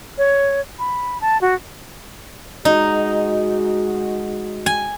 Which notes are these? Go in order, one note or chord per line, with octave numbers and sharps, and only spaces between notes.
C#5
B5
A5
F#4
G#3 D#4 F#4
G#5